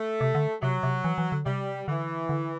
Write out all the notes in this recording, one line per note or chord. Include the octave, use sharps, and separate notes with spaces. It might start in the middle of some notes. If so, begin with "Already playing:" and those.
Already playing: A3
C3
D3
C3 F#3
C3
E3
E3
D3
C3 G3
D3 E3
D3